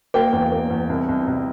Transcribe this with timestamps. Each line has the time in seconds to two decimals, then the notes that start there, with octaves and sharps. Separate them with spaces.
0.14 A#3 G5
0.33 E2
0.52 A#3
0.70 E2
0.89 C2
1.09 C2
1.27 C2